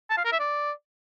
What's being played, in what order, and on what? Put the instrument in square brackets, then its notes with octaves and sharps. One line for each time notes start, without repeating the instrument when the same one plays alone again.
[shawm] A5
F5
A#4
E5
D5